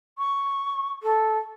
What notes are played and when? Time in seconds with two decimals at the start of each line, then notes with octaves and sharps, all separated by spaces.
0.18 C#6
1.03 A4